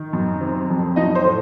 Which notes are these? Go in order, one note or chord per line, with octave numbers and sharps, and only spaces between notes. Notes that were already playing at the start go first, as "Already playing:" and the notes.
Already playing: D#3
F#2
C3
F2
F#3 D#4 D#5
C4 C5
A2